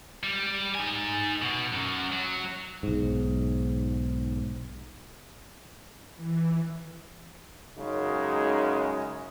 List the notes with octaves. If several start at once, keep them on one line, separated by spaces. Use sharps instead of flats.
G3
D#4 G#5
B2
F#2
F#3
B1 G#2
E3
F#2 C#3 G#3 D#4